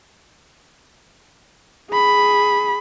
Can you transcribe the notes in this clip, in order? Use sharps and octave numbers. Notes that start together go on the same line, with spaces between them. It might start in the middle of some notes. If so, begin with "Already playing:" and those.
G#4 B5